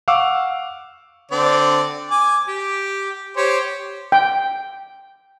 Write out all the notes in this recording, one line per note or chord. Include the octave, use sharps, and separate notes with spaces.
F5 F#5 C#6 D6 E6
D3 C4 D5
G#5 D6
G4
G4 C5 C#5
G5